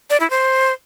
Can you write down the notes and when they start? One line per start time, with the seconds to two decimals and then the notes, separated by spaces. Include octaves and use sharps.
0.10 D5
0.20 E4
0.30 C5